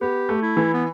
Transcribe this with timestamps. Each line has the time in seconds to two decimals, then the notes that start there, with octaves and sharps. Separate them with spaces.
0.01 B3 G4
0.29 A3
0.43 E4
0.57 E3
0.74 B3